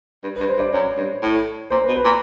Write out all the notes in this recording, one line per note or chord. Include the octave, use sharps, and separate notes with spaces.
G2
G2 B4
C5
G2
D5
F#2 C#5
G2
A2
A#2 C5
B4
B2
B4
A#2